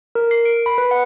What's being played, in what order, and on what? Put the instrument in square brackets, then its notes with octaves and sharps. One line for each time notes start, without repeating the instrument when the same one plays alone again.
[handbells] A#4
C7
D7
B5
B4
F#5